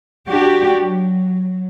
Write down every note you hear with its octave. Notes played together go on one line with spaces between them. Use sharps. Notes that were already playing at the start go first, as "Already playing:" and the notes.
D4 F#4 G4
F#3